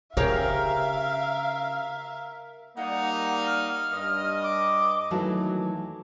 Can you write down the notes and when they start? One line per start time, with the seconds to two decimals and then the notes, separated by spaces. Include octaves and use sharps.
0.17 C#3 G4 G#4 A#4 C#5 E5 F5
2.77 G3 A#3 D#4 F#5
3.47 F6
3.92 G2 D#5
4.43 D6
5.11 D#2 E3 F#3 A3 F#4 A5